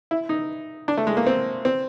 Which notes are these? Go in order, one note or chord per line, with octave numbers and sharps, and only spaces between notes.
E4
D#4
D4
A3
G#3
A#3
C4
C4